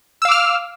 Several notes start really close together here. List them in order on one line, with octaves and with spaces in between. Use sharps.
E6 F5 D6 F6